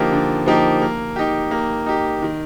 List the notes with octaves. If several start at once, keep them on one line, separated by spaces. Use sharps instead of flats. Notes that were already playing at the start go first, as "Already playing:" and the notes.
Already playing: D3 F3 A#3 D#4 G4
D3
F3 A#3 D#4 G4
A#3
D#4 G4
A#3
D#4 G4
D#3